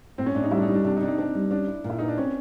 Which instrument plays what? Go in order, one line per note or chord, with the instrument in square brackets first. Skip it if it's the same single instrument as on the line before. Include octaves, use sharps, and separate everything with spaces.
[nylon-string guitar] A2 [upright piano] C4
[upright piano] C#4
[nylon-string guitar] A2 [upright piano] D4
[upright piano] D#4
[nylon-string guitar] G3 [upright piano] E4
[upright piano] D4
D#4
[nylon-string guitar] G3
[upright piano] D4
[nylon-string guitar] C3 [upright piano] D4
[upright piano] D#4
[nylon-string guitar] C3 [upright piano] D4
[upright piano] D#4
[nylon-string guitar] C4 [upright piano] D4
[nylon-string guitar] G3
[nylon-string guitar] C#4 [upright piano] D4
[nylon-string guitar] E4
A#2
[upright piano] E4
[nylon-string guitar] B3 [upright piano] D#4
[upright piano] D4
[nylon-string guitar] C4 [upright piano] C#4